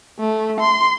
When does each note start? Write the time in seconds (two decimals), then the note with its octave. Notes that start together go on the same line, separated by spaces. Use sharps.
0.20 A3
0.60 C6